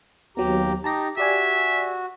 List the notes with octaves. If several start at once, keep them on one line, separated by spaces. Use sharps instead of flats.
D#2 F#3 B3 G4 A#5
D#4 G4 A5 A#5 A#6
F#4 G4 D5 E5 G#5